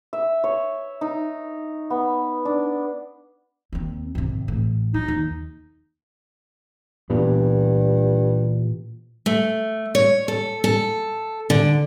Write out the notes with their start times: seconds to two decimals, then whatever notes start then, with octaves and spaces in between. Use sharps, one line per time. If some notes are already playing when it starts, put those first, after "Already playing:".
0.13 E5
0.44 C#5
1.01 D#4
1.90 B3
2.45 D4
3.73 D#2 C4
4.15 G#1 C3
4.48 A1
4.94 F#3 D#4
5.08 D#2
7.10 G2 A#2 E3 B3
9.26 A3
9.95 C#5
10.28 A4
10.64 A4
11.50 D3